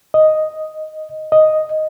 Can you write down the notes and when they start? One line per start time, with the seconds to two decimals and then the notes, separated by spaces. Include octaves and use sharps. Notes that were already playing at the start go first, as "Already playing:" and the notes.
0.14 D#5
1.32 D#5